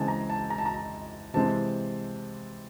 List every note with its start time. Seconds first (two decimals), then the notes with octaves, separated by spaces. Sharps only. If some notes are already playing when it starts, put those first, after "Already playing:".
Already playing: C#3 E3 G#3 C4 G#5 A5
0.08 A#5
0.30 A5
0.50 A#5
0.58 A5
0.65 A#5
1.34 C3 E3 G#3 C4 A5